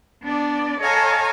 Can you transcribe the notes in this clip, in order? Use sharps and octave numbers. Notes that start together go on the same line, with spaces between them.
B3 D4 D5
A4 C#5 D#5 F5 G#5 A#5